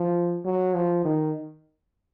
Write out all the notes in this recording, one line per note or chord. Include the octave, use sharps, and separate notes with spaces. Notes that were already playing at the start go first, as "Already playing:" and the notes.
Already playing: F3
F#3
F3
D#3